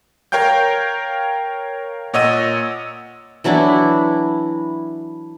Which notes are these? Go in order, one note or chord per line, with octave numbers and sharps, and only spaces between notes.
A#4 C#5 F5 G5 G6
A#2 C#5 D#5 F#5 E6 D#7
E3 F#3 D4 E4